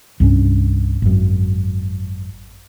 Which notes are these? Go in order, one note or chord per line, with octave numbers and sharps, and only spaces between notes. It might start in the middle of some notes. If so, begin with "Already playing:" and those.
C2 G2 C#4
G#1 F#2